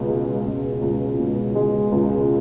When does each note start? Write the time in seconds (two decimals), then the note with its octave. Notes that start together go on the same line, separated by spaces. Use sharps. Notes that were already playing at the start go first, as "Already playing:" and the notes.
Already playing: C#2 B2
0.09 G#3
0.46 C#2
0.82 C#2
1.19 B2
1.55 G#3
1.92 C#2